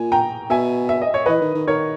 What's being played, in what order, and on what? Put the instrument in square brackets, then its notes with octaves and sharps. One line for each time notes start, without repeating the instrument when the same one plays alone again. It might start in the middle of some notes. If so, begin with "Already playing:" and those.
Already playing: [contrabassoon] A#2 [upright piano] G#5
[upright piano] G5 A#5
[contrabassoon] B2 [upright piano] E5 G#5
[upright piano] E5
D#5
C#5
[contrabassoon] E3 [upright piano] B4 D#5
[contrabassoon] D#3
D#3
[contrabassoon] D#3 [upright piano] A#4 C#5